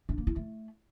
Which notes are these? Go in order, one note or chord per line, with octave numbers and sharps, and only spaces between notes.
D4
A#3
E4
A3